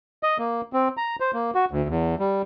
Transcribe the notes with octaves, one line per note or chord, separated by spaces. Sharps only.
D#5
A#3
C4
A#5
C5
A#3
F#4
D2
E2
G3